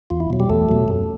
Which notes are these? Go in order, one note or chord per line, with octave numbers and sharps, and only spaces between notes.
E2 F4
E4
B2 F#3
G3 G4
E2 A3 A4
B2 F#3
F#2